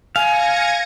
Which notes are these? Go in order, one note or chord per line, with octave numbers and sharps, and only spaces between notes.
F5 G#5 G#6 A#6 C#7